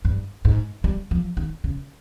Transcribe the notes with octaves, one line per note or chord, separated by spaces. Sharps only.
G2
G#2
G3
F3
D#3
C#3